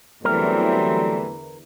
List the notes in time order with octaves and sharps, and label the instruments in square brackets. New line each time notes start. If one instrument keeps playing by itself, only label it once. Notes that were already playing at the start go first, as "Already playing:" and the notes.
[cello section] E2 D3 E3 [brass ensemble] F#3 G3 C4 [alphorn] A3 [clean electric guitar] A#4